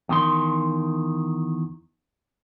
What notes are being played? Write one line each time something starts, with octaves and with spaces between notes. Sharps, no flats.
E2 D#3 C6